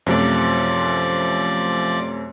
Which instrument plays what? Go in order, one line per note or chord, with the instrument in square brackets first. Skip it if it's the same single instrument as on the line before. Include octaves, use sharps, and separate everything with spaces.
[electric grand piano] F#2 C3 A3 [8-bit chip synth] F3 D5